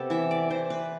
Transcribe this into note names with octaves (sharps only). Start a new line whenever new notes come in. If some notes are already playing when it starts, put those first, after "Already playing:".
Already playing: C3 B3 G4 A4
E3 E5
D5
E3 C5
B4